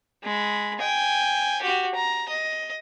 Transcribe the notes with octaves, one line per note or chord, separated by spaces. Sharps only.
G#3 B5
G5 G#5
F#4 G4
A#5
D#5